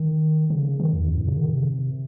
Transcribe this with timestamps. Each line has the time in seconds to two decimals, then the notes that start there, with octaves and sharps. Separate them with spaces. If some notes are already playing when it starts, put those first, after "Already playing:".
Already playing: D#3
0.50 C#3
0.80 D#3
0.93 E2
1.08 F#2
1.17 A2
1.27 C#3
1.37 D#3
1.52 C3